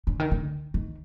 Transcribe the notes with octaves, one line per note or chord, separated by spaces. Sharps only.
D3
D#3
D3
D#3